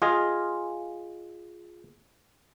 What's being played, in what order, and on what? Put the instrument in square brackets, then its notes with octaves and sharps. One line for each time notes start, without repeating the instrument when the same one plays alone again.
[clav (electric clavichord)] F4 G#4 D#5